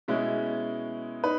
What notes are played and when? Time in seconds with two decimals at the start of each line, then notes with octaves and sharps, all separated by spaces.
0.08 B2 G#3 C#4 E4
1.23 D#4 B4